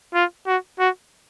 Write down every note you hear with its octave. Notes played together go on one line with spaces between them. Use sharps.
F4
F#4
F#4